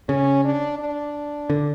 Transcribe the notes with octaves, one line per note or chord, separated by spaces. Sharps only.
C#3 C#4
D4
D4
D3